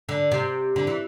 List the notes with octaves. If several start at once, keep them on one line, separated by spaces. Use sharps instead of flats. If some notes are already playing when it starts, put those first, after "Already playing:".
D3
C3
D3
E3